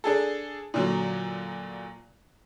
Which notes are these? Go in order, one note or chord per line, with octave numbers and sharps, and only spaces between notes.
D4 G#4 A4
A#2 D3 F#3